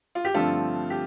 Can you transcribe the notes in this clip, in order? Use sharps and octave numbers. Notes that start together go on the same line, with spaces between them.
F4
G4
G2 D3 F3 A3 C4 F4 A4
G4